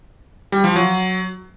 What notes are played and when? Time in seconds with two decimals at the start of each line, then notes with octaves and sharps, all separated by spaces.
0.52 G3
0.64 F3
0.76 F#3